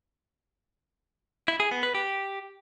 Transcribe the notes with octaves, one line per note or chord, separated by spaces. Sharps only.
E4
G#4
B3
B4
G4